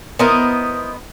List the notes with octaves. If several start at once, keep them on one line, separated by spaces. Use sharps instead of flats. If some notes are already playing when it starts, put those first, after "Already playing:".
B3 E4 A#4 C5 D#5